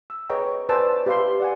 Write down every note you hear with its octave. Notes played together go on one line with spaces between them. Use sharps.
E6
G#4 B4 C#5 D#5 G5 A#5
B4 C5 D5 G#5 A5 E6
G4 B4 E5 F5 B5 C6
D5 F#5 G#5